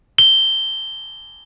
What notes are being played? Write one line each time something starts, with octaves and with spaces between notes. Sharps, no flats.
G7